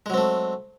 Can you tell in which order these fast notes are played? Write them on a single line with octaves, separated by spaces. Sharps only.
G#3 F#3 C4 A3